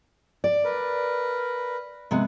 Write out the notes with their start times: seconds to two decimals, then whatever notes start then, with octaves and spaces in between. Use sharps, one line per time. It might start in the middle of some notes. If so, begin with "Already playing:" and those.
0.44 D5
0.65 A#4 B4
2.11 C3 G#3 B3